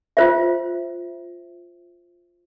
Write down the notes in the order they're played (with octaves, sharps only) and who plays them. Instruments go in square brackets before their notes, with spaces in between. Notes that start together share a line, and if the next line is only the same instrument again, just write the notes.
[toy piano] F4 C5 E5